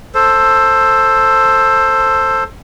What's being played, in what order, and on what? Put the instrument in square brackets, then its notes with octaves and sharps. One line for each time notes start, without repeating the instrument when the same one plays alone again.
[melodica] A4 C5